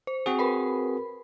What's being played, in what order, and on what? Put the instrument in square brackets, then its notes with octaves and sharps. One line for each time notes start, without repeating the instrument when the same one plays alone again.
[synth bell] C5
[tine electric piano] C4 F#4 G#4
[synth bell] A#4 B4 B5